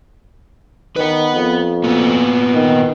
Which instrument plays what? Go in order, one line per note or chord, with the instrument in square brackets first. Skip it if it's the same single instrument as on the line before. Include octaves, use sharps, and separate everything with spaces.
[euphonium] D#3 [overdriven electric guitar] B4 F#5
[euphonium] F2
[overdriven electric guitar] A#2 B3
[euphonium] D#3